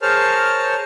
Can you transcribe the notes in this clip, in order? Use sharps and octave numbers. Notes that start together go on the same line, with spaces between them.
G#4 A#4 C5 C#5 A5 F6